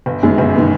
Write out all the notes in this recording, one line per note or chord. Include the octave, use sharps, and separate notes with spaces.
G1
F#2 D#3 G#3 B3
G1
D#3 G#3 B3